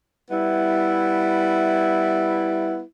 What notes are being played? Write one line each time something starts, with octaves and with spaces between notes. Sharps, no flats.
G3 B3 E4